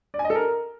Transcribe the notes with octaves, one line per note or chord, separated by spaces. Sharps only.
D5
G#5
D#5
A4
A#4